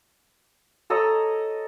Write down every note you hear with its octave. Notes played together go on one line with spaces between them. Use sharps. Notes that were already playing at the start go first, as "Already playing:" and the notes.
A4 C#5 D#5 A#5